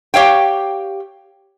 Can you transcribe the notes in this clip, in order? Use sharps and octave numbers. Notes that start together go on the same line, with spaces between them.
G4 C#5 F5 G5